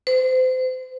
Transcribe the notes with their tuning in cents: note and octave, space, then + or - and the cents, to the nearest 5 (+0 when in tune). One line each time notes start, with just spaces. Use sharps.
C5 -30